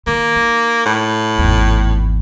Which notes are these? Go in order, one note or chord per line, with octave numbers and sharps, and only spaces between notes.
D#3 A#3
D#4
A2
G#1 E2